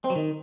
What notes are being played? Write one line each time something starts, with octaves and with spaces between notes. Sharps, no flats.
C4
F#3
D#3